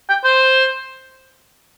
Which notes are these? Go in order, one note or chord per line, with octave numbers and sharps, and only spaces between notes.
G5
C5